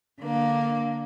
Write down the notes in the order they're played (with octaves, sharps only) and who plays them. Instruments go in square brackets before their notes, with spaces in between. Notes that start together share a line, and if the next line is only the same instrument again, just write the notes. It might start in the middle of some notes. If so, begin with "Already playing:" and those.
[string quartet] D3 A#3